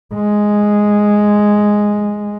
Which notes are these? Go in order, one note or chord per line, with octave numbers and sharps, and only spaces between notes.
G#3